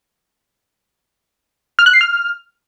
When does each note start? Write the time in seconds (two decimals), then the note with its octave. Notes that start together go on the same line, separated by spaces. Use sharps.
1.79 F6
1.86 F#6
1.93 C7
2.01 F6